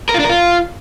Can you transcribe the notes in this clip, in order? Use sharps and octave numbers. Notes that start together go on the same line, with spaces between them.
A#4
F4
D4
A#4
F4